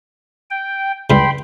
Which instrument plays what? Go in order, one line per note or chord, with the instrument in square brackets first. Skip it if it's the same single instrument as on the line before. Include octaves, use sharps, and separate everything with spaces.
[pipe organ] G5
[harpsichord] C#2 G2 [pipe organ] G5 B5 C6